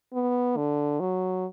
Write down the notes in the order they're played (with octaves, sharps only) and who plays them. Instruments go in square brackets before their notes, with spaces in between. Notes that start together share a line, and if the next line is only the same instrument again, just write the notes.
[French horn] B3
D3
F#3